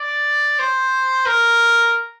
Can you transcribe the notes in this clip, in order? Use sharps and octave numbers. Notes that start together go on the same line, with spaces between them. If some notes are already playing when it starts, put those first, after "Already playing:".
Already playing: D5
C5
A#4